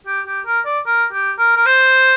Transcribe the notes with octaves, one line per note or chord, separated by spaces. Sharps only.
G4
G4
A#4
D5
A#4
G4
A#4
A#4
C5